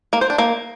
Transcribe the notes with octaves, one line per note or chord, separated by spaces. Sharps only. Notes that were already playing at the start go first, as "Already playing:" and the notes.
A#3
C5
D4
A#3